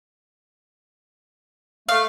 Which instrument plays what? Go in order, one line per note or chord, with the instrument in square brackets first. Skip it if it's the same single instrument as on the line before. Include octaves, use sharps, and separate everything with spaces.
[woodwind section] A3 [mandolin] F5